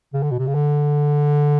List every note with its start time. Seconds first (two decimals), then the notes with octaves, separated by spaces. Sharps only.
0.13 C#3
0.23 D3
0.31 B2
0.38 C3
0.47 C#3
0.55 D3